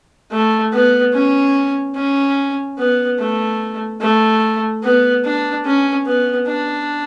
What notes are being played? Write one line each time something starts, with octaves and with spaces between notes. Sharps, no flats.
A3
B3
C#4
C#4
B3
A3
A3
B3
D4
C#4
B3
D4